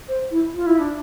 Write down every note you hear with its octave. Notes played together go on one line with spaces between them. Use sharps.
C5
E4
F4
E4
D4